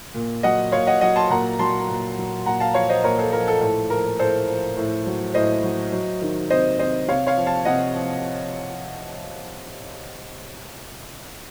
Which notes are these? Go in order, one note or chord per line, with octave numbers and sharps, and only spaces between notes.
A#2
F#3 D#5 F#5
A#2 C#5 F5
D#5 F#5
F#3 D#5 F#5
A5 C6
A#2 F#5 A#5
F#3 A5 C6
A#2
F#3
A#2 F#5 A#5
F5 A5
F3 C#5 F5
C5 D#5
A#2 A#4 C#5
A4 C5
F3 A#4
A4
A2 A4
F3 A#4
A2 A4 C5
F3
A2
F#3
A2 C5 D#5
F#3
F#3
D#3
C3 C5 D#5
C3 C5 D#5
C3 C#5 F5
C#5 F5
F3
F5 A5
C3 D#5 F#5
F3